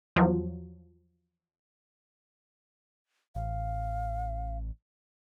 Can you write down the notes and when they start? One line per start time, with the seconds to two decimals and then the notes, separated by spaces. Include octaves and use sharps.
0.16 E2 F3 F#3
3.35 A1 F5